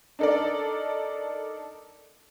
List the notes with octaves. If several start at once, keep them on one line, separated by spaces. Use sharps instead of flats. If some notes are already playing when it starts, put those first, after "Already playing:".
D4 D#4 A4 A#4 D5